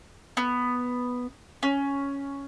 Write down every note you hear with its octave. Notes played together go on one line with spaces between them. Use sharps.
B3
C#4